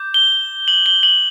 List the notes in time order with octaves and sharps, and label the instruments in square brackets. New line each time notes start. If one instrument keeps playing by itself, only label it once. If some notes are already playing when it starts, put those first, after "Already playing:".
Already playing: [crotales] D6 G6
G7
F#7
G7
F#7